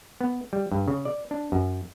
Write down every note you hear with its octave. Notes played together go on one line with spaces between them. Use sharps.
B3
G3
G2
C#3
D5
D4
F#2